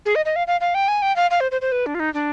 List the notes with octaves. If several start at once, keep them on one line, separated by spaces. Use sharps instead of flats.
G#4
D#5
D#5
F5
F5
F5
G5
G#5
G5
F5
F5
C5
C5
C5
B4
D4
F4
D#4
D4